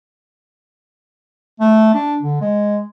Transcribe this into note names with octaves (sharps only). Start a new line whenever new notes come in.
A3
D4
D3
G#3